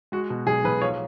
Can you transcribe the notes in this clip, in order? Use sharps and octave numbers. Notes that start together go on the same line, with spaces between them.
G#3 F#4
B2
B1 G#4
B1 B4
F3 C#5